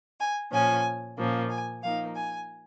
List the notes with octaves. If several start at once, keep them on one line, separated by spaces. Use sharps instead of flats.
G#5
A#2 F3 C#4 G#5
A#2 F3 A#3 C#4
G#5
F3 A#3 D#4 F5
G#5